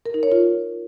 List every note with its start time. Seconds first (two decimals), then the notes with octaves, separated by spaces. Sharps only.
0.06 A#4
0.14 D#4
0.23 C#5
0.32 F4